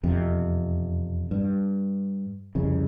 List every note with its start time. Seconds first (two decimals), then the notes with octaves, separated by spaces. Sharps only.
0.03 E1 F2 C3
1.31 G2
2.55 C2 F2 C#3